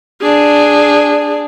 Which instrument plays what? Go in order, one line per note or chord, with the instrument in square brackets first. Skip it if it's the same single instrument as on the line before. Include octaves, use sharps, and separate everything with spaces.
[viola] D4 G#4